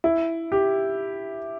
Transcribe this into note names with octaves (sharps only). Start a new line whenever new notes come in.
E4
G4